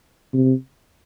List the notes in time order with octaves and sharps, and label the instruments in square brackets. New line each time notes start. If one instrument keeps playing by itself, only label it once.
[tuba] C3